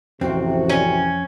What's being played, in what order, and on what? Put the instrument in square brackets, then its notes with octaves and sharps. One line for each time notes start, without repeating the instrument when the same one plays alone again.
[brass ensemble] A1 C3 [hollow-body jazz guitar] F2 C4 [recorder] F#4
[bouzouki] C#4